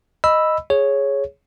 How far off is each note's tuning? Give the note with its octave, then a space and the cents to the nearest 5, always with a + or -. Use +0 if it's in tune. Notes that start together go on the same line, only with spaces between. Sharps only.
D#5 +0 B5 +0 E6 +0
G#4 +0 C#5 +0